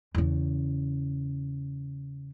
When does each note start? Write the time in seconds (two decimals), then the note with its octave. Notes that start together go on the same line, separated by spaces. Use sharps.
0.15 E2 C#3